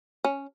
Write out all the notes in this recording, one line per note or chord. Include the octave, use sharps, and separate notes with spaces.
C#4